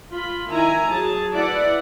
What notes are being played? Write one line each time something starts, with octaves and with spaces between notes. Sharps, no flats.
F4 B5
D#3 E4 G#5 A#5
F#3 G#4 A5
E4 B4 D5 F#5